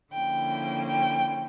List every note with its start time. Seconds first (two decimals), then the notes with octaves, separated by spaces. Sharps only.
0.12 D3 F3 A#3 C#4 E4 G5
0.86 G5